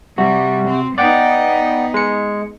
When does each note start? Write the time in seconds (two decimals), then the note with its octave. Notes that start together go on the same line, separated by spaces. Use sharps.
0.18 C3 G3 F#4
0.68 C4
0.98 B3 D#4 D5 F#5 G5
1.94 G#3 C#7